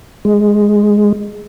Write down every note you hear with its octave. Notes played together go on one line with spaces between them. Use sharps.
G#3